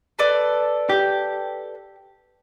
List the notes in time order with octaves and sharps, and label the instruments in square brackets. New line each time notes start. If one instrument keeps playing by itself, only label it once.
[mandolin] A4 B4 D5
[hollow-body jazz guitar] G4